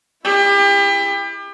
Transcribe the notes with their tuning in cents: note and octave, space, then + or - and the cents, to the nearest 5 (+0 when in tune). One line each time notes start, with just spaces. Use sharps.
E4 +15 G4 +35